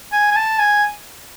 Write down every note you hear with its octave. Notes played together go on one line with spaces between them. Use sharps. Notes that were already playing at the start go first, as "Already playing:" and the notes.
G#5
G#5
A5
G#5